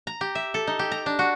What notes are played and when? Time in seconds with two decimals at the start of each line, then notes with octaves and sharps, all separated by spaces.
0.07 A#5
0.21 G4
0.35 E5
0.54 A4
0.67 D#4
0.79 G4
0.92 A#5
1.06 D4
1.19 F#4